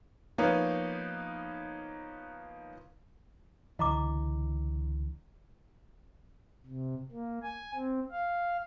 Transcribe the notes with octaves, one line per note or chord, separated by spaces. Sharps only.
F3 A#3 B3 D#4 B4 C#5
C#2 D3 E3 D#5 A#5 D6
C3
A#3
G#5
C4
F5